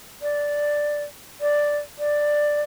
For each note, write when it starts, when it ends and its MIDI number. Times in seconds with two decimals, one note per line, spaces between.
0.22 1.03 74
1.41 1.78 74
1.99 2.62 74